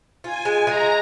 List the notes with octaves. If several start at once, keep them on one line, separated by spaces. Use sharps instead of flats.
F4 G#5
G#3
G#3 A#5